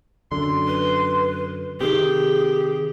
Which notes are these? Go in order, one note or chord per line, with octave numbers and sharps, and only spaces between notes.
F#2 D3 C6
B4
C3 D#3 G4 G#4